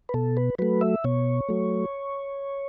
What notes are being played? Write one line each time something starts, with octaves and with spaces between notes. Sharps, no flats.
B4
B2 A4
B4
F#3 A3 B4
E5
B2 C#5
F#3 A3